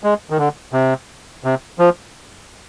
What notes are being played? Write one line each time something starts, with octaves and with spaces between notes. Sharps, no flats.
G#3
D#3
D3
C3
C3
F3